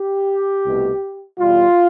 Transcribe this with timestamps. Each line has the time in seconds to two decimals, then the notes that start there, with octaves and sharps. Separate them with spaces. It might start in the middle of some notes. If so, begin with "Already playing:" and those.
Already playing: G4
0.64 C2 B2 A3
1.39 E2 B2 G3 F4